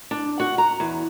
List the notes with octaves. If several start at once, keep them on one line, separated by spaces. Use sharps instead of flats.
D4
F#4
A#5
E2